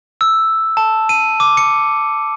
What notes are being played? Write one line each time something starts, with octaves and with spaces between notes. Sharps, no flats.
E6
A5
D#7
D6
C#7